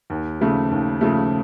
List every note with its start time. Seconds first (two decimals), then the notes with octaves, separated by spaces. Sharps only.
0.10 D#2
0.41 C#3 F3 A3
0.71 D#2
1.01 C#3 F3 A3